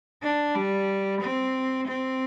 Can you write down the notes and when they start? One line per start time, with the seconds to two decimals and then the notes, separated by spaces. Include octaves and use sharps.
0.22 D4
0.55 G3
1.21 C4
1.87 C4